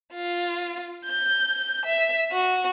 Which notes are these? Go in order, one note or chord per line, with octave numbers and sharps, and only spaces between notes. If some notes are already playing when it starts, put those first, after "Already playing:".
F4
G6
E5
F#4